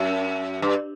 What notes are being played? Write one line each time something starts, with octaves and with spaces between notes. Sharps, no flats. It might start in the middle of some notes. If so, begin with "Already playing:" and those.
Already playing: F#2
G2